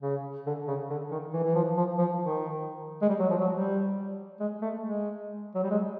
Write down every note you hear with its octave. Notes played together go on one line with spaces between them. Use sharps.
C#3
D3
C#3
D3
D#3
E3
E3
F3
F3
F3
D#3
G#3
G3
F#3
F3
F#3
G3
G#3
A3
G#3
F#3
G3
G#3